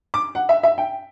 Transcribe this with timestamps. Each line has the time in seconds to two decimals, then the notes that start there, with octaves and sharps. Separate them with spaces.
0.14 D6
0.35 F#5
0.49 E5
0.63 E5
0.78 G5